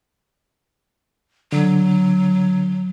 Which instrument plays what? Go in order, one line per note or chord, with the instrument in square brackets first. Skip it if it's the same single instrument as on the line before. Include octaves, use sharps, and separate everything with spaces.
[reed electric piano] D3 [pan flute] F#3